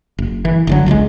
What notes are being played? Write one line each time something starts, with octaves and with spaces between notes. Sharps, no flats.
F#1
E3
F#1 D3 F#3
E1 C#2 D#3 G#3